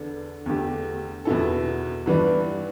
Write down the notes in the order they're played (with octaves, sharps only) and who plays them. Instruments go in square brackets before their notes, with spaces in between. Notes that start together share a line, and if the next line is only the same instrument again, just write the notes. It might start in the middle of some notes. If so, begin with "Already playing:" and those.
Already playing: [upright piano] E2 D3 B3 D4 A4
E2 D3 A3 G4
E2 B2 B3 E4 A4
G2 E3 B3 D4 B4